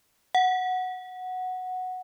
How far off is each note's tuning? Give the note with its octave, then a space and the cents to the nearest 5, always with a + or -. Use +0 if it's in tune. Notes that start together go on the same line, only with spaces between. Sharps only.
F#5 -5